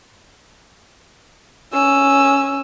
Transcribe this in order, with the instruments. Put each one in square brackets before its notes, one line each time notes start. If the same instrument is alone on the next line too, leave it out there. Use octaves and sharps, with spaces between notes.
[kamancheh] C#4 E6